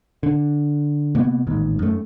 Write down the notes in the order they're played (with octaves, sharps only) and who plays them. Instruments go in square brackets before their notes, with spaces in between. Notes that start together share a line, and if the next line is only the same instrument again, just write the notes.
[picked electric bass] D3
C3 A#3 B3
A1 D#2 G#2
F#2 A3